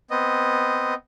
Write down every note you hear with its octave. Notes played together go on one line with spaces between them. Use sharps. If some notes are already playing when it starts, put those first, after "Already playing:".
B3 C4 D#5